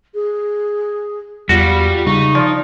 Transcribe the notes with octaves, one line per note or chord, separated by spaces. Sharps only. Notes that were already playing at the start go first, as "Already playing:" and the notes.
G#4
E2 G3 F4 F#4
C#3 D#4 C#6
F3 D5